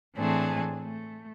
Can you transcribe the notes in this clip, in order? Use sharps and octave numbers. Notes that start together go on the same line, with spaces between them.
A2 E3 A3 C4 D4 G#4
A3